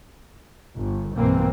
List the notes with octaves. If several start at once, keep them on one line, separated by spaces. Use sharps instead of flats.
G1
B1 G2 E3 A#3 C4